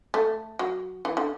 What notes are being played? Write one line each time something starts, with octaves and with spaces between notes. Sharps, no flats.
A3
F#3
E3
D3